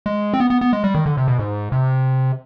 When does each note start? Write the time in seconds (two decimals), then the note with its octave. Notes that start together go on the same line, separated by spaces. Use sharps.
0.06 G#3
0.34 C4
0.40 B3
0.50 B3
0.61 B3
0.73 G#3
0.84 G3
0.95 D#3
1.06 D3
1.17 C3
1.28 B2
1.39 G#2
1.72 C3